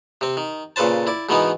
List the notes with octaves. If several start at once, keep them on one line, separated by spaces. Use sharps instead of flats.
C3 C4
D#3
A#2 C#3 A4 B4 C5 A5
E4 D5
G#2 B2 D#3 E3 B3 D#4